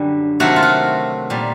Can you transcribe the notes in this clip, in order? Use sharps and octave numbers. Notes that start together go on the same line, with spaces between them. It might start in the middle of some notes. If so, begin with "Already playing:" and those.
Already playing: F#2 D3 G3
C3 D#3 F#3 A3 F#4
F4
F#4
A#2 G3